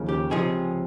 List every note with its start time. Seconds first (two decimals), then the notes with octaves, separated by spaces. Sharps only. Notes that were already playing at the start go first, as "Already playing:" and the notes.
Already playing: D#2 C#3 F3 A#3
0.09 G4
0.30 C#2 C3 F3 G#4